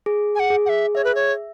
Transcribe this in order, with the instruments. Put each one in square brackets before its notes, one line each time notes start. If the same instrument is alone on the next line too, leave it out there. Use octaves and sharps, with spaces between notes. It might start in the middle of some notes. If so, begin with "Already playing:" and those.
[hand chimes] G#4
[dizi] G#5
F#5
[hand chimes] G#4
[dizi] F#5
E5
[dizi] C#5 [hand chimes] E5
[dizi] B4
C#5